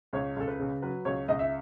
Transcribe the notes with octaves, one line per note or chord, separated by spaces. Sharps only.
C#2 C#5
C#2 A4
B4
C#3
F#3 B4
C#2 C#5
C#2 D#5
E5